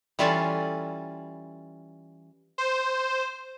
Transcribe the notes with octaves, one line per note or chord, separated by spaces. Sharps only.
E3 G3 C#4 F4 A4 D5
C5